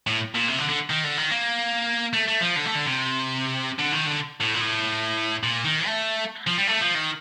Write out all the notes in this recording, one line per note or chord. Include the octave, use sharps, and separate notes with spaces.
A2
A#2
C3
D3
D3
D#3
D3
D#3
A#3
A3
A3
F3
D3
A3
D3
C3
D3
D#3
D3
A2
A#2
A2
A#2
D#3
A3
F3
G3
A3
F3
D#3